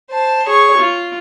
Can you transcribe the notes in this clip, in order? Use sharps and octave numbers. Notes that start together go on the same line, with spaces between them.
C5 A5
G#4 C#5 C#6
F4